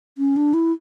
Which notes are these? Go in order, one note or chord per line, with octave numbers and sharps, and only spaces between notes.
C#4
D4
E4